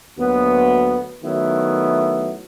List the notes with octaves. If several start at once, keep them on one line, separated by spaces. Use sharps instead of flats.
D2 F#3 A#3 B3
D#3 F#3 A3 B3 E4